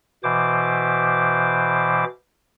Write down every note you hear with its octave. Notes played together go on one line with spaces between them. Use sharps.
B2 E3 C5 D6